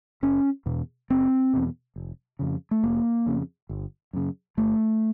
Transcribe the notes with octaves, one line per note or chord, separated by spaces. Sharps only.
F#1 C#4
E2 B2
F#1 C4
E2 B2
F1
F2 C#3
A3
F1 A#3
F2 C#3
G1
F#2 C#3
G1 A3